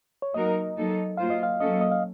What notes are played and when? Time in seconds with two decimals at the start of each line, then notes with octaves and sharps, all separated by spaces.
0.22 C#5
0.34 F#3 A#3 D#4 F#4 A#4 D#5
0.76 F#3 A#3 D#4 A4
1.17 F#3 A#3 F4 C5 F5
1.30 D#5
1.43 F5
1.60 F#3 A#3 C#4 A4 D#5
1.81 D#5
1.92 F5